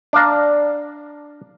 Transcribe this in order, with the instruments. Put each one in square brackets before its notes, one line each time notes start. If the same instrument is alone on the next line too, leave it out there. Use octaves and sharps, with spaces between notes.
[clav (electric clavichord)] D4 D5 F5 A#5